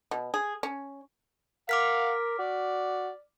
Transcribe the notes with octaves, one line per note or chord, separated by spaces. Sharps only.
B2
G#4
C#4
A#4 F5 F#5 D6 F6 B6
F#4 D5